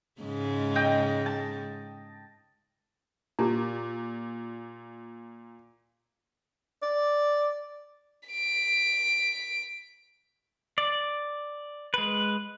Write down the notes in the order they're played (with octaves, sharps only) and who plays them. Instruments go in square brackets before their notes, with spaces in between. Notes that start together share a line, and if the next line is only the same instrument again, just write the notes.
[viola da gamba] G#2 C#3 G#3
[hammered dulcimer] D#5 G5
A5
[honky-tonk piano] A#2 [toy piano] G4 A#5
[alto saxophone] D5
[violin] B6 D7
[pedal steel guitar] D5
G#3 B4